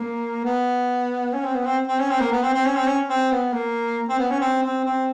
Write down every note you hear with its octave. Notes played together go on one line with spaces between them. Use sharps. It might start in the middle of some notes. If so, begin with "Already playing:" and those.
Already playing: A#3
B3
C#4
C4
B3
C4
C4
C#4
C4
A#3
B3
C4
C4
C#4
C4
C#4
C4
B3
A#3
C4
B3
C#4
C4
C4
C4